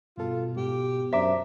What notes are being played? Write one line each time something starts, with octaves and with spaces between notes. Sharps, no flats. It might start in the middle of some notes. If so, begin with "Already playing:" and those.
G2 B2 F4 A4
G#2 G4
F#2 D4 C5 E5 A#5 D6